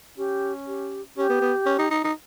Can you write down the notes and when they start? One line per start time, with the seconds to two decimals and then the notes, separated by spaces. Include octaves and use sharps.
0.18 C#4 G4
0.67 G4
1.17 C#4 G4
1.30 B3
1.41 B3
1.66 C#4
1.78 D#4
1.91 D#4
2.04 D#4